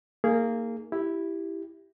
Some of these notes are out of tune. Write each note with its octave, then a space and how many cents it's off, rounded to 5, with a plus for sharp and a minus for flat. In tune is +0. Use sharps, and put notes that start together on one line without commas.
A#3 -20 D#4 +0 G#4 +0
E4 +0 G4 +0